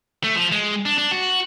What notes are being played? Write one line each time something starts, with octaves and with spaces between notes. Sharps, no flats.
A3
F3
G#3
D4
D4
F#4